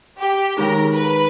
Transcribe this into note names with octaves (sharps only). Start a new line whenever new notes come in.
G4
D#3 G#3 D#4 G#4 A#4
B4